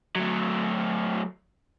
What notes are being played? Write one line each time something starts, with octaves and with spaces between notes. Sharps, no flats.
F#3 A3